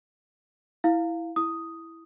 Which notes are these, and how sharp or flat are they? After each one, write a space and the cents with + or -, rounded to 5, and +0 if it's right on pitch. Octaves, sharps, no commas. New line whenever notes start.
E4 +0 F5 +0
E4 +0 D#6 +0